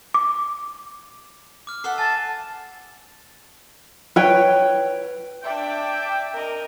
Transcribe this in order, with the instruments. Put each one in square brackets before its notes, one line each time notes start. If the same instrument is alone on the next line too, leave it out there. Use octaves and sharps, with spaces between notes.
[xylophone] D6
[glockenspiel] D6 F6
[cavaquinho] A4 E5 F#5 [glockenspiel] C7
[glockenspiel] G#5 A6 [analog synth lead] A5
[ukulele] B4 C#5 G5
[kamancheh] D4 D5 [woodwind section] E5 G5
[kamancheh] A#4 D#5